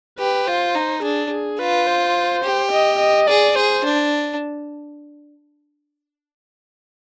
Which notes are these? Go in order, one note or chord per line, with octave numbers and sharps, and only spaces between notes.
G4 B4
F4 C5
D#4
D4 G#4
G#4
F4 B4
C5
G4
D#5
D#5
G#4 D5
G#4 C5
D4